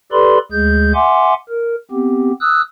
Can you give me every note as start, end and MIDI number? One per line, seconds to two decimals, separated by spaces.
0.12 0.38 67
0.12 0.38 69
0.12 0.38 71
0.12 0.38 74
0.12 0.38 83
0.12 0.38 84
0.52 0.92 38
0.52 0.92 56
0.52 0.92 68
0.52 0.92 91
0.94 1.34 76
0.94 1.34 78
0.94 1.34 80
0.94 1.34 84
0.94 1.34 86
1.49 1.75 70
1.91 2.32 59
1.91 2.32 60
1.91 2.32 67
2.41 2.61 87
2.41 2.61 88
2.41 2.61 90